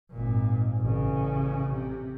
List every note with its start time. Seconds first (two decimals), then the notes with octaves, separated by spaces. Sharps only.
0.11 G#1 A#2
0.81 A1 C#3
1.73 C3